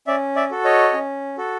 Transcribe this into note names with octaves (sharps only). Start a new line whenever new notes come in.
C#4 D5 E5
D5 E5
F#4 A4
C#5 D#5
C#4
F#4 A4